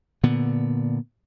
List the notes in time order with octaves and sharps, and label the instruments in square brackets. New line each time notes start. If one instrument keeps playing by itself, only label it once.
[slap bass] A#2 D3 B3